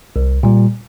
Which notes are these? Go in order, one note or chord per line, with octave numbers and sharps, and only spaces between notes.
C2
A#2 G3